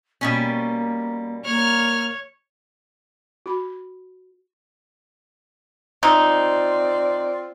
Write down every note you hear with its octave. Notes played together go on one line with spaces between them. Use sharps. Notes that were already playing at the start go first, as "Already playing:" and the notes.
B2 G3 A#3 C#4
A#3 C#5 F6
F#4 B5
C3 C4 D#4 F4 D5